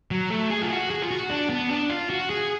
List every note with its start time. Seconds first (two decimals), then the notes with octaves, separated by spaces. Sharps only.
0.11 F#3
0.30 A3
0.50 G#4
0.62 F4
0.71 F#4
0.90 G#4
1.03 F4
1.11 F#4
1.30 D4
1.50 B3
1.71 D4
1.89 F4
2.10 F#4
2.30 G#4